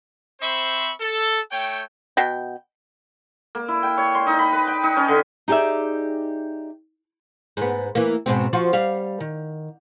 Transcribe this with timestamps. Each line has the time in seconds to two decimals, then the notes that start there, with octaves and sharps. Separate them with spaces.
0.41 C4 C5 E5 B5 C#6
1.01 A4
1.51 A3 C#5 G5
2.17 B2 F#4 G5
3.55 A#3
3.68 E4
3.83 G5
3.97 C#5
4.15 C6
4.27 D#4
4.39 B5
4.53 B4
4.67 G5
4.84 D#4
4.97 C#4
5.08 D3
5.48 D#4 G4 G#4 D5 E5
7.57 G#2 B3
7.95 E3 A#3
8.26 G#2 B2 C4
8.53 F3 F4 F#4
8.73 G3 F5
9.20 D#3